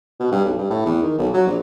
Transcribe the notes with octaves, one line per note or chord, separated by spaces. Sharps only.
B2
G2
B1
G2
A2
E2
D#3
B1
F#3
A#1